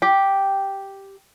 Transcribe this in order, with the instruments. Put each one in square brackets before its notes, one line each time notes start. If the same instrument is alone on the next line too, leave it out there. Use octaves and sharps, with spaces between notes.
[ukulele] G4 G5